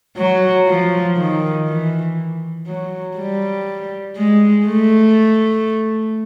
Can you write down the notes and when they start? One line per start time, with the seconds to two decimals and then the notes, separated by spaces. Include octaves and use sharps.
0.17 F#3
0.67 F3
1.17 D#3
1.67 E3
2.66 F#3
3.17 G3
4.16 G#3
4.66 A3